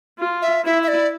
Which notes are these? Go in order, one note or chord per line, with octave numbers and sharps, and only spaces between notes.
F4
E5
E4 E5
E5
D5